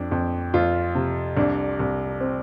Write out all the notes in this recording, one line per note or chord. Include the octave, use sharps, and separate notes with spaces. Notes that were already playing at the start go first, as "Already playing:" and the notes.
Already playing: F2 D4
F2
F2 F4
C3
C2 D4
C2
C4